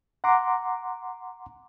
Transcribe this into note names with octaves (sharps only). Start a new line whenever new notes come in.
F#5 A#5 C6 D6